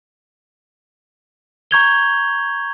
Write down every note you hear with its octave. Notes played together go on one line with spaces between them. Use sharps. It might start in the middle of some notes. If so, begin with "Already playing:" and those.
A#5 C#6 G6 G#6 F7 G7